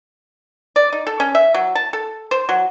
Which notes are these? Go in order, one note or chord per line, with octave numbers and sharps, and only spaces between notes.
D5
D#4
A4
C#4
E5
F#3
A5
A4
C5
F#3